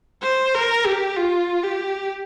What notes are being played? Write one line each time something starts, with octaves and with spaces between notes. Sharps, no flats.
C5
A#4
G4
F4
G4